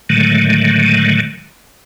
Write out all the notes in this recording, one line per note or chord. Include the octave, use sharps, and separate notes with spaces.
A2 D3 D#3 F#3 G#3 A3